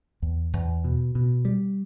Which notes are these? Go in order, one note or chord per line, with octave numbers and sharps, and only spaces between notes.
E2
E2
B2
B2
G3